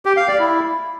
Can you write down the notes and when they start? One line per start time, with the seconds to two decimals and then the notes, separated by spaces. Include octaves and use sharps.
0.05 G4
0.17 F5
0.28 D5
0.39 E4